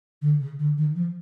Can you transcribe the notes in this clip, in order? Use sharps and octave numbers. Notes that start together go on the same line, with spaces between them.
D3
C#3
D3
D#3
F3